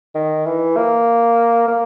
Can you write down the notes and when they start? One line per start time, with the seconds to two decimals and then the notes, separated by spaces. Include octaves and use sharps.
0.15 D#3
0.46 E3
0.76 A#3
1.68 A#3